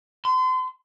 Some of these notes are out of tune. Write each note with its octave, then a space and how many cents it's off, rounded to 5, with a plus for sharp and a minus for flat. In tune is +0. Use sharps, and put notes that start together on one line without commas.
C6 -35